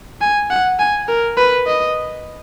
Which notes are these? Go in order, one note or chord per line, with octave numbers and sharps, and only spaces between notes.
G#5
F#5
G#5
A#4
B4
D#5